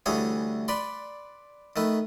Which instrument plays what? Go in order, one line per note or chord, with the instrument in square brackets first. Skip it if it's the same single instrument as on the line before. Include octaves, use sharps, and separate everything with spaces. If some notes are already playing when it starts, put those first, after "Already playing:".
[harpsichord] D2 E3 G3 G#4 C#5
B4 D5 B5 C6
D#3 A3 B4